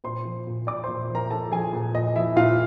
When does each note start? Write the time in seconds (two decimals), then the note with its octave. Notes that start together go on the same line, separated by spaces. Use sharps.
0.04 A#2 C5 C6
0.25 F3
0.47 A#2
0.67 A#2 D5 D6
0.84 A#2 C5 C6
1.10 F3 A#4 A#5
1.30 F3 A4 A5
1.51 F3 G#4 G#5
1.73 A#2
1.95 A#2 D#5
2.15 F3 E4 E5
2.36 A#2 F4 F5